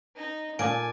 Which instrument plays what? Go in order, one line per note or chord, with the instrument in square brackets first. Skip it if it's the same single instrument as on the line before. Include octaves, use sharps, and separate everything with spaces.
[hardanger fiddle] D#4 D#5
[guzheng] A#2 [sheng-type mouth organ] G#5 [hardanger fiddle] A5 [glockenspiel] D6 D7